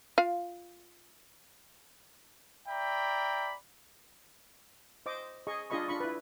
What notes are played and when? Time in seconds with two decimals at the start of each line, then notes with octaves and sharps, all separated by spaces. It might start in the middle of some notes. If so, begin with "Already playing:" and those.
0.18 F4 F5
2.68 D5 E5 G5 A#5 B5
5.06 C5 D#5 D6
5.47 G#4 D#5 C#6
5.70 D4 F4 G#4 D#5 B5 C#6
5.88 D4 F4 B5 C#6
6.00 E4 B4